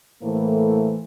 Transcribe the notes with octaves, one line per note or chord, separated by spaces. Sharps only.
A2 E3 A3 A#3 A4 C5